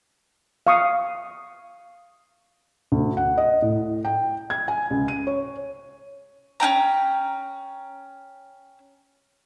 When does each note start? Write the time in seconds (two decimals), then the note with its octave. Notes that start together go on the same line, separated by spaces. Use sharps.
0.67 F5 C#6 D#6
2.92 D2
3.17 F#5
3.38 D#5
3.62 A2
4.05 G5
4.50 G#6
4.68 G#5
4.90 C#2
5.08 D#7
5.27 C#5
6.60 C#4 D#4 G5 A#5